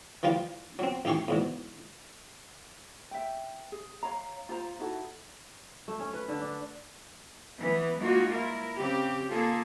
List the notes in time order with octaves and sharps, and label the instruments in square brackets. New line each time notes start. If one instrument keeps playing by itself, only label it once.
[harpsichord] E3 F3 G3 F4
F#3 C4
A1 D#4 G4 G#4 C#6
E2 G#2 B2
[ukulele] E5 G5
G#4
C#5 F5 A#5
F4 C5 A#5
D#4 E4 F#4 A4
[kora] A3
C#4
B4
D3
D4
[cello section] E3 B3
G3 G#3 A#3 D#4 F4 F#4
E4 A#4
C#3 C4 G4
A#3 F4 G#4 A4